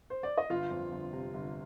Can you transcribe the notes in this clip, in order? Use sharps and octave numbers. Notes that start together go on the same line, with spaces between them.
C5
D5
D#5
G1 F4 F5
F2
G1
C3
G1